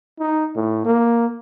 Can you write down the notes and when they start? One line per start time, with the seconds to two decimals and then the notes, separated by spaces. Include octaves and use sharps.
0.20 D#4
0.56 A2
0.85 A#3